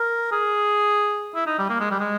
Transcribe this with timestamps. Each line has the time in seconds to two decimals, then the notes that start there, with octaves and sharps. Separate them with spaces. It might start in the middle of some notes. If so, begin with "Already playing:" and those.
Already playing: A#4
0.32 G#4
1.35 E4
1.47 D#4
1.59 G3
1.69 A#3
1.80 G#3
1.91 G3
2.00 G#3